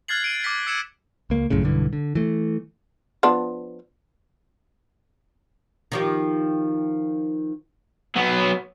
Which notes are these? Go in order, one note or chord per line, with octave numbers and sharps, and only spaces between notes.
F6 F#6 G#6 A6 C7 F#7
C7 D7 D#7
D6 F6 B6
E6 G#6 C#7 E7
C#2 A#3
A#1 F#2 A2 C#3
B1 G2 D3 E3
D3
E3 A3
F3 B3 D4
D#3 F3 G4
F#3 B3